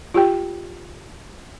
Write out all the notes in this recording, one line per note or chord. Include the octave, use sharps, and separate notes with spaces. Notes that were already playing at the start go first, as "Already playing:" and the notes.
F4 G4 G5